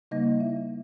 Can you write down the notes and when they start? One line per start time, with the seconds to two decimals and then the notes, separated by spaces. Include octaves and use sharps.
0.11 C#3 G3 A#3 D#4 D#5
0.40 E4 E5